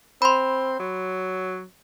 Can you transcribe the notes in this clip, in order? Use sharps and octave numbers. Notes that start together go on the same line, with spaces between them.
C4 B5 C6
F#3